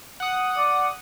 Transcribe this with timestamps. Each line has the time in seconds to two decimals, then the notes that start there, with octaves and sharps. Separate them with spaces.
0.20 F#5 D#6
0.57 D5